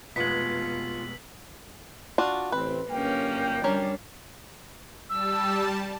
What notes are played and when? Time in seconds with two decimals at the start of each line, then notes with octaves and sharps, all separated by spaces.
0.16 F1 B2 G#3 B3 F4 B6 F#7
2.18 D4 F4 F#4
2.52 A1 C4 B4
2.90 G1 F#2 A#3 C#4 G5
3.64 G3 C#4 D4 A#4
5.10 G3 A5 E6